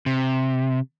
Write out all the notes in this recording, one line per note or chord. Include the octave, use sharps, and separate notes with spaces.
C3